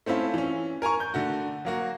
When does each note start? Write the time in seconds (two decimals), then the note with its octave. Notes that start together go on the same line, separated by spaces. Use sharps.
0.06 A3 C4 C#4 E4 F4
0.34 E3 C#4
0.82 A#4 G#5 A#5 C#6
1.00 G6
1.14 D3 A3 F#4
1.65 F#3 A#3 F#4